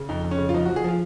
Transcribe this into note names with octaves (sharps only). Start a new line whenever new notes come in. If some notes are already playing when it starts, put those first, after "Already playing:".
Already playing: C#3
F2 D#4
F2
C#4
C#3
F4
F3 D#4
F#4
F3
G#4
F3 F4